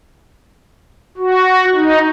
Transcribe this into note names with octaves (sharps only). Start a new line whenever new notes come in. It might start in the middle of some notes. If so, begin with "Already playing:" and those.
F#4
D#4